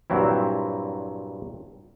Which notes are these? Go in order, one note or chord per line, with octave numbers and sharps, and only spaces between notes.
G2 A#2 F#3 C4 E4